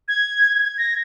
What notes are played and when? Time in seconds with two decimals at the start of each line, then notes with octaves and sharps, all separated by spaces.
0.08 G#6
0.78 A#6